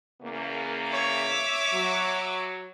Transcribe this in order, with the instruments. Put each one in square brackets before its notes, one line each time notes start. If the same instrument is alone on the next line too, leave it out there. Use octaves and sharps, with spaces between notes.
[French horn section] E2 C#3 A#3
[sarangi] C#5 [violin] E5 D6
[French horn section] F#3